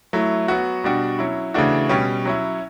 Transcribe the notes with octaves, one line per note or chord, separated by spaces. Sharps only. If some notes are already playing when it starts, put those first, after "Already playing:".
F#3 A3 E4
F#3 B3 F#4
B2 G3 D4 F#4
F#3 C#4 E4
C#3 E3 A3 D4 F#4
B2 G3 C#4
F#3 C#4 E4